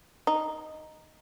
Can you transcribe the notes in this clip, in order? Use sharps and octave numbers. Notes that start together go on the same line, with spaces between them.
D#4